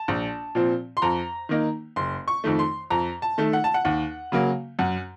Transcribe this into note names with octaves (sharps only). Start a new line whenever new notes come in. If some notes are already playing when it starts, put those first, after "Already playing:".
Already playing: A5
A#1
A#2 F3 C4
C6
F2 A#5
D#3 A#3 D#4
F#1 C6
C#6
F2 D#3 A3
C6
F2 A#5
A5
D#3 A3
F#5
A5
F#5
D#2 F#5
C#3 F#3 A#3
F#2 F#5